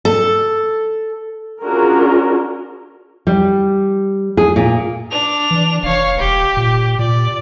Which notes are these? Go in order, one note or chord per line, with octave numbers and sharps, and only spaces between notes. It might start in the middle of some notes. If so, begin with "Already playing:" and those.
A4
C#4 D4 F4 F#4 G#4 A#4
G3
G#4
A#2
D4 F7
E3
F1 C#5 F5
E1 G4
A#2
A#2 D5